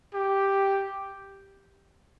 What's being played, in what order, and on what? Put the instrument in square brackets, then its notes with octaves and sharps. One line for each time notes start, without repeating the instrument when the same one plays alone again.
[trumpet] G4